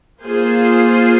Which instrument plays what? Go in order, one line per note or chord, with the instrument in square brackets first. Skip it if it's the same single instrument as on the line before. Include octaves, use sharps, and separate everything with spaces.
[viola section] A#3 F4 G#4 C5